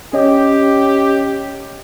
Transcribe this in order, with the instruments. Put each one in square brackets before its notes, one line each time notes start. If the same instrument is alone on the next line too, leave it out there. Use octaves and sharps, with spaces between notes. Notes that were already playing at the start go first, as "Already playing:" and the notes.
[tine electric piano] C#4 C#5 D#5 [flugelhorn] G4